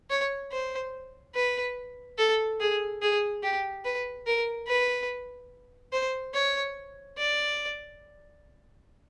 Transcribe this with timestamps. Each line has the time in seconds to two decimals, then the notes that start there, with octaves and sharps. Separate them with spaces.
0.10 C#5
0.52 C5
1.35 B4
2.18 A4
2.60 G#4
3.02 G#4
3.43 G4
3.85 B4
4.27 A#4
4.68 B4
5.93 C5
6.34 C#5
7.18 D5